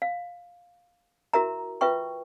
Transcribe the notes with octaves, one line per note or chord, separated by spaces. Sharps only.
F5
E4 F#4 A#4 E5 A#5
F4 B4 E5 G5 C#6